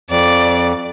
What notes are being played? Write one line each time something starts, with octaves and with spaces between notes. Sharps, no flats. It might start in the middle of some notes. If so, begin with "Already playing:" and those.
F2 D5